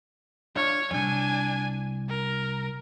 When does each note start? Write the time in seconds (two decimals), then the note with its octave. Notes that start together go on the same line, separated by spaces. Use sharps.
0.56 D4 F4 C#5
0.91 C2 F2 D4 G#5
2.09 A#4